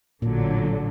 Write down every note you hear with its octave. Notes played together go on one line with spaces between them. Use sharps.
A1 A#2 D3 F#3